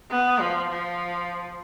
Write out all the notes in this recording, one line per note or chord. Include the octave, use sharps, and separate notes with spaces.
B3
F3
F3